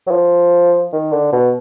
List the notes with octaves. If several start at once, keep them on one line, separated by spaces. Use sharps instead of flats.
F#3
F3
D#3
D3
B2